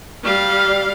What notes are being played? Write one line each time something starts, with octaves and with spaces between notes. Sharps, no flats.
G3 F5